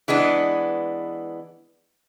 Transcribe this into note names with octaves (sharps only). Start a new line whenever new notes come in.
E3 G#3 B3 D4